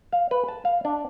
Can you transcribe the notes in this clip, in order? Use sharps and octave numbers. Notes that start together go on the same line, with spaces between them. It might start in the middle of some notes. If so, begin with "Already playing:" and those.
F5
B4
A5
F5
D4